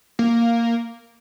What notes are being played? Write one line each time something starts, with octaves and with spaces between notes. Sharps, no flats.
A#3